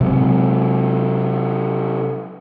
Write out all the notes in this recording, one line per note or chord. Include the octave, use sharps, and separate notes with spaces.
C3 F#3 G#3